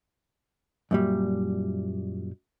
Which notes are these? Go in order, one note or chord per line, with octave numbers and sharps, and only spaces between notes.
F#2 A#2 G3